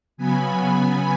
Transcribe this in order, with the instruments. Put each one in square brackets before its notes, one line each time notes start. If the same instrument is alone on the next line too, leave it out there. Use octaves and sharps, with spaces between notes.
[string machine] C#3 F#3 B3 G#5 B5